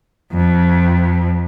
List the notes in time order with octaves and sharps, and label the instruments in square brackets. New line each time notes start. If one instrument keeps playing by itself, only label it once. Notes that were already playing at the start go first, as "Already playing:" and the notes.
[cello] F2